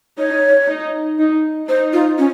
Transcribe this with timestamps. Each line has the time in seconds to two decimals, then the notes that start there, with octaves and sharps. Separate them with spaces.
0.18 D#4 C#5
0.68 D#4
1.19 D#4
1.68 D#4 C5
1.93 F4
2.18 C#4